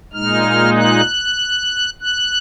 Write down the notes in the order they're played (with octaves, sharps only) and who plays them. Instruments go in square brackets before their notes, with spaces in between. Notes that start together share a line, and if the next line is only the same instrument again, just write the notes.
[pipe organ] A#2 G#3 D#4 F6
F#6
F#6